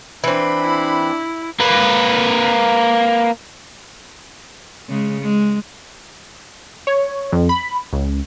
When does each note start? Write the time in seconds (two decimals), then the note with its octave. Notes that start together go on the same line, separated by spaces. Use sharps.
0.24 E3 C4 D4 B5
0.61 E4
1.60 A#3 B4
4.89 C#3 G#3
5.21 G#3
6.87 C#5
7.32 F2
7.49 B5
7.93 C#2